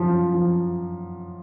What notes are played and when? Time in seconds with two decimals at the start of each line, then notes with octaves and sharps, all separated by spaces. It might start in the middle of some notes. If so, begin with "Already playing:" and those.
Already playing: F#2 F3
0.34 F3